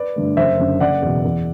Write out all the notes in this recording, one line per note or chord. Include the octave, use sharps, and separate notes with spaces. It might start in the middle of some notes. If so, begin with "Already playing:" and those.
Already playing: B4 D5
G2 D3 A3
F#1 C5 E5
F#2 D3
F#1 D5 F#5
E2 B2
E2